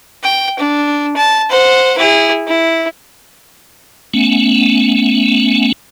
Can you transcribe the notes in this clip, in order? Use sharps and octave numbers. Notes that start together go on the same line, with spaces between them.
G5
D4
A5
C5 F#5
E4 G#4
E4
A3 B3 C#4